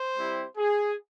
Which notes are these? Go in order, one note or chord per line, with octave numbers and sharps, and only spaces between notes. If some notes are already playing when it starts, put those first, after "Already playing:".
Already playing: C5
G3 C4 E4 G4
G#4